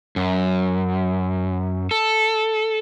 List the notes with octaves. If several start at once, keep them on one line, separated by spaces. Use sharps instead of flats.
F#2
A4